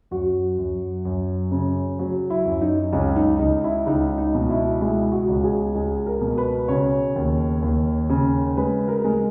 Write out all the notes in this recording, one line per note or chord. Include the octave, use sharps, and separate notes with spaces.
F#2 F#4
F#2
F#2
C#3
F#3
E4
F#2
D#4
C#2 C#4
D#4
C#2 D#4
E4
C#2 D#4
D#4
B2
E4
G#3 E4
F#4
C#2
G#4
C#2 G#4
A#4
B2
B4
C#3 C#5
D#2
D#2
C#3
G#3 B4
A#4
G#3